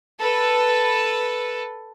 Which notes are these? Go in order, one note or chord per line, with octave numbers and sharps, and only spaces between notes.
A4 B4